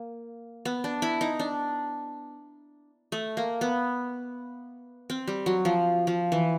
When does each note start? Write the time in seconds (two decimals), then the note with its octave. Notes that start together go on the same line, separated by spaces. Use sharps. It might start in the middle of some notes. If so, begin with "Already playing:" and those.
Already playing: A#3
0.65 B3
0.84 D4
1.02 E4
1.21 D#4
1.39 D4
3.12 A3
3.37 A#3
3.61 B3
5.10 C4
5.27 G3
5.46 F#3
5.65 F3
6.07 F3
6.32 E3